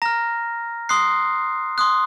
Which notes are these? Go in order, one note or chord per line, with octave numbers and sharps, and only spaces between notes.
A#5 F6 A#6
C6 D#6 F#6 C7
C6 D#6 F#6